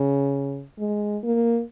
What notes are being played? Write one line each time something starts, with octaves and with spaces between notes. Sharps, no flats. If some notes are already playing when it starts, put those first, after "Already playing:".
Already playing: C#3
G#3
A#3